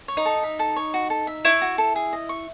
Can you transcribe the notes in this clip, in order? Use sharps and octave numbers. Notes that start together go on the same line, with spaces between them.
C#5
D#4
A4
E5
A4
C#5
F#4
A4
E5
E4 C#5
F#4
A4
G#4
D#5
C#6